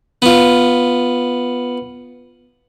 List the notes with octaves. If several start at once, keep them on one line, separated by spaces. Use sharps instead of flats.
B3 F4